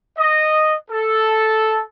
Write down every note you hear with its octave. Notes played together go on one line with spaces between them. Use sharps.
D#5
A4